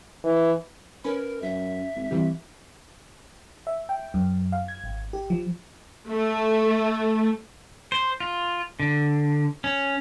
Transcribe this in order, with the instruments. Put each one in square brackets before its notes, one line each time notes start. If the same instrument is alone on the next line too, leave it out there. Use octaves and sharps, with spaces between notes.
[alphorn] E3
[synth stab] C#4 B4 [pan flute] A#4
[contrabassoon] F#2 [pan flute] E5
[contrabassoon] G#1
[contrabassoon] C3 [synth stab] E3 G3
[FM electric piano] E5
G5
F#2
F5
G#6
G#1
G4
F3
[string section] A3
[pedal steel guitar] C5
F4
D3
C#4